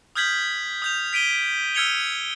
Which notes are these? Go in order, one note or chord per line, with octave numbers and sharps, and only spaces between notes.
D#6 F6 G6 G#6 B6 F#7
D#6 G6 F7
B6 D7 D#7 G7
E6 F6 G#6 C#7 F7 G7